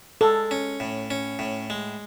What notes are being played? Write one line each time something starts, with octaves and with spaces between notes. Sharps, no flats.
G#3 A4
C#4
A2
C#4
A2
G#3